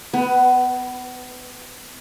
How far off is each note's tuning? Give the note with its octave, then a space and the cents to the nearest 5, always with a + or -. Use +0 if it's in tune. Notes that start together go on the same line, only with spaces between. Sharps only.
B3 +25 B4 +0